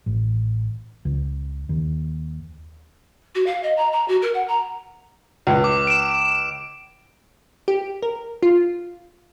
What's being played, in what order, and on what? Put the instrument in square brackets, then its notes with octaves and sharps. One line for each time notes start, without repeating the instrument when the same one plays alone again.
[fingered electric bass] A1
C#2
D#2
[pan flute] F#4
F5
D#5
A#5
A#5
F#4
A#4
F#5
A#5
[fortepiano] C#2
[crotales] D6
D7 E7
[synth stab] G4
A#4
F4